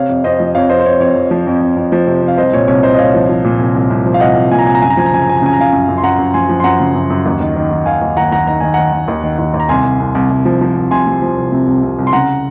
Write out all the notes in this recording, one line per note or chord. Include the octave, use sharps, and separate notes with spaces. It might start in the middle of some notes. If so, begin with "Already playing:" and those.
Already playing: C3 C#5 F5
F2
F2 C5 D#5
F3
F2 C#5 F5
F2 C5 D#5
C5
F2 C#5
F2 C#5
F2
F3
F2
F2
F2
F3
C3
C3
F5
C2 C5 D#5
A#2 C#5
C2 C#5
C2 C5 D#5
D#5
C2 C#5 F5
F3
F3
A#2
C2
C2
C2
F3
F5
C2 D#5 F#5
C2
A#2 G#5
A#5
C2 G#5
A#5
F#2 G#5
A#5
F3 G#5
A#5
C#3 G#5
A#5
F#2 G#5
A#5
C#3 G#5
A#5
C#3 F5 G#5
F#2
F#2
C6
F#2 F#5 A#5
F#2
F3 G#5 C6
F3
C6
F#2 F#5 A#5
C#3
F#2
F#2
D#2
D#3
D#3
D#3
D#3 F5 G#5
D#2
D#2 F#5 A#5
D#2 F#5 A#5
D#3 A#5
D#3 G#5
D#3 F#5 A#5
D#3
D#2
D#3
D#2
D#2
A#5
C2 G#5 C6
C2
C2
C2
C2
F3
F3
C2
C3 G#5 C6
C3
F3
C2
C3
C2
C2
C2
C6
C#3 F#5 A#5